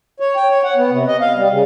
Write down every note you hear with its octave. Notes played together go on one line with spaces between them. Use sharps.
C#5
G5
C#5
F#5
B3
C3
D#5
F5
G3
C#3